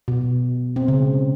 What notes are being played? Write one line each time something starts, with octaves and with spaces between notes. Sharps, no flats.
B2
C4
C#3